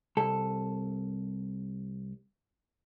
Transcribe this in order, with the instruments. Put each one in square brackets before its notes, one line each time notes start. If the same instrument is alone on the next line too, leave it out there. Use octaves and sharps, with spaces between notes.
[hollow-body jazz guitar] C2 A4